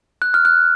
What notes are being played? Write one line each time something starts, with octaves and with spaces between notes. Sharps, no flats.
F#6
F6
F#6